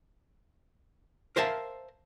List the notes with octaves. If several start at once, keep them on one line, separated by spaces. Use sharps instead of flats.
A#4 C5 E5 F5 A5